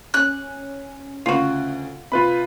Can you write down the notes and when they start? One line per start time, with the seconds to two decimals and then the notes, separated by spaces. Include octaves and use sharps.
0.14 C#4 F#6
1.26 D2 C#3 F4 F#4
2.12 C3 F4 B4 B5